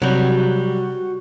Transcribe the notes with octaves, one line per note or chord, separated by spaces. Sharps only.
C3 F#3 G3 F#4